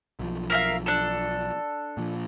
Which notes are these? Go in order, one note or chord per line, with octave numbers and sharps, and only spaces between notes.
B1 F3
A#4 E5 F5
D4 A4
A#2 F3